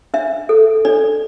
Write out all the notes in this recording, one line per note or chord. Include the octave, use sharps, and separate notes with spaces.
D4 E5
A4
D4 D5